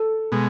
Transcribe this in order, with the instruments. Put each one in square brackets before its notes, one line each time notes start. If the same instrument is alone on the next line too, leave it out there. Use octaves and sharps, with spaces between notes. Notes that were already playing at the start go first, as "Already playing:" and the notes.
Already playing: [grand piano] A4
[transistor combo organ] B2 G#3